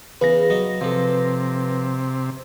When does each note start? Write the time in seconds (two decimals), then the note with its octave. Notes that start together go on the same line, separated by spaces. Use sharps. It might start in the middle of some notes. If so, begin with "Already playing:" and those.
0.21 E2 C#3 B4 A#6
0.50 F#3 D#4
0.81 C3 F3 A4